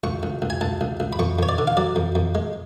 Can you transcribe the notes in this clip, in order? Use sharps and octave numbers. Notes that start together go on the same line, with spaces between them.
C#2 C#6
C#2
C#2
G#5
C#2 A5
C#2
C#2
B5
F2 C#6
F2 C#5
D5
D3
F5
F#3 D5
F2
F2
G#3